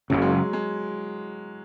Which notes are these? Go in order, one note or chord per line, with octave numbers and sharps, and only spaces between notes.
F#1 F#2 C#3 F#3
G#3
F#3
G#3